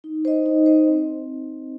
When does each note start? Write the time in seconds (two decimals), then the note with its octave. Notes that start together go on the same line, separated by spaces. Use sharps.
0.04 D#4
0.25 C5 D#5
0.46 D#4
0.66 C5 D#5
0.88 C4